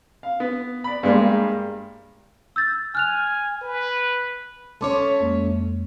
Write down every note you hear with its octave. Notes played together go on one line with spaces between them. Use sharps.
F5
B3
D5 B5
G2 G3 G#3 A#3
E6 G6 A6
G#5 F6 F#6 F7
B4
A3 C#4 C#5 A5 C6 D6
F2 G#3 A#3